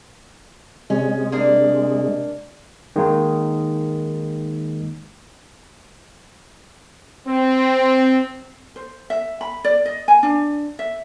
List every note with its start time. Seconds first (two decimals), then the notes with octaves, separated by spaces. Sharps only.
0.90 C3 G#3 C#4
1.32 A#3 D4
2.96 D#3 G#3 A#3 D#4
7.27 C4
8.76 C5
9.10 E5
9.41 B5
9.65 D5
9.86 D#5
10.08 G#5
10.23 D4
10.79 E5